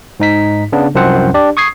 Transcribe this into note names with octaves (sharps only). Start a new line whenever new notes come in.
G#2 D#4 B6
C#3 B3 D4
C2 F#2 F3 C4 C5 F#5
D4 G4 D5
C#6 D#6 G#6 C7